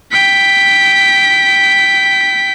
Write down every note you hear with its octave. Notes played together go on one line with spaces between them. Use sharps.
G5 B6